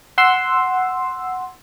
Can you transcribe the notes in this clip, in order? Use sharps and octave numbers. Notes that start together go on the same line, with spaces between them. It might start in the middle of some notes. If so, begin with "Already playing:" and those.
F#5 C6 E6